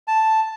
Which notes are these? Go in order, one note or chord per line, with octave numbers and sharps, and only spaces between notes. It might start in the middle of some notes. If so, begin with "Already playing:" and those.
A5